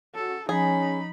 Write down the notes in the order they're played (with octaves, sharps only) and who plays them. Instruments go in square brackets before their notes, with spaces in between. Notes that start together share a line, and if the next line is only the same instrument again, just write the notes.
[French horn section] C#4 F#4 [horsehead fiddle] A4
[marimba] F3 [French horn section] C#4 [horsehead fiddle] D#4 B5 [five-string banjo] G#4